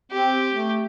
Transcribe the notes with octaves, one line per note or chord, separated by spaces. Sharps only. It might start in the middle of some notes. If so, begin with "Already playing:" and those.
C4 G4
A3